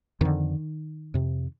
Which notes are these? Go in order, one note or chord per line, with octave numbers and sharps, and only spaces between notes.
F2 D3 D#3
F2 C3